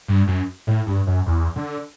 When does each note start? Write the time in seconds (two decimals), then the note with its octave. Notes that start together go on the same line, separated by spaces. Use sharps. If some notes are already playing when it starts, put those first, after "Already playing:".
0.08 G2
0.27 F#2
0.67 A2
0.87 G2
1.07 F#2
1.27 E2
1.56 D3